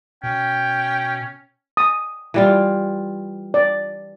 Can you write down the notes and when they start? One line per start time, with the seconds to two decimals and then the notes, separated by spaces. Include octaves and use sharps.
0.23 B2 C#4 G5
1.77 D#6
2.34 E3 G3 F4
3.54 D5